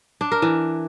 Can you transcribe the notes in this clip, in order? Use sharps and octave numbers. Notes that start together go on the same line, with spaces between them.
D4
A#4
E3